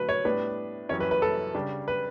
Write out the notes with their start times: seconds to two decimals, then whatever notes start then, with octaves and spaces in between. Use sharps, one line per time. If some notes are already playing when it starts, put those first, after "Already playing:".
Already playing: D3 F#3 A3 B4
0.09 C#5
0.24 A2 G3 B3 D4 B4
0.89 F#2 E3 G3 C#4 C#5
1.00 B4
1.11 B4
1.22 A4
1.55 C#3 G3 D4
1.88 B4